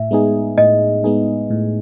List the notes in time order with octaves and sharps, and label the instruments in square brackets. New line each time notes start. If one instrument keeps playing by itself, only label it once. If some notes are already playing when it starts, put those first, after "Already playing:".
Already playing: [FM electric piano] A2 [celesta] E5
[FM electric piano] G#3 B3 D#4 G#4
[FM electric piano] A2 [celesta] D#5
[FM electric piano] G#3 B3 D#4 G#4
A2